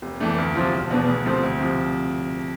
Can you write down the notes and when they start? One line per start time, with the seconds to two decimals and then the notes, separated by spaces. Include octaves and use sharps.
0.02 F1
0.20 F2 E3 A3 D4
0.38 D2
0.55 C3 F3 C4 F4
0.72 E1
0.90 E2 B2 B3 D4
1.08 D2
1.25 C3 F3 A3 C4
1.43 D2
1.60 C3 F3